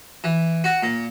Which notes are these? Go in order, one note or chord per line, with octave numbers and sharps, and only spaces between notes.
E3
F#4
A#2